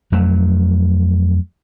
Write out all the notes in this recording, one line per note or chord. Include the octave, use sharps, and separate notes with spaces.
F2 F#3 A3